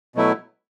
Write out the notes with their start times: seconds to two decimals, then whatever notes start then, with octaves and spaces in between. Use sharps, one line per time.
0.16 B2 F#3 A3 E4